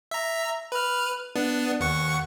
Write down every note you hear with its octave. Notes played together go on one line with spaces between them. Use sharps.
E5 A#5
B4 F6
B3 D4
D#2 F#5 C#6